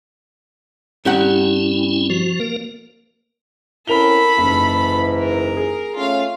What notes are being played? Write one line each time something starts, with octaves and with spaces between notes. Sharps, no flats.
G2 C4 C#4 E4 G4 F#5
F3 F#4
A#3 A#4
C4 C#4 E4 A4 A#4 B5 F7 G7
F#1 G#2 E3
A#4
G#4
A3 C#4 F4 F5